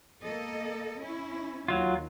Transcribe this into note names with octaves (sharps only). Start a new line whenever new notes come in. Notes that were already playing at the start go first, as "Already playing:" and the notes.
A#3 A4 D#5
C#4 E4
D#2 F#3 F4